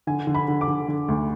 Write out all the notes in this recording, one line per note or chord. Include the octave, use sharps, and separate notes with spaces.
D3 G#5
D3
B5
D3
D6
D3
D3
D2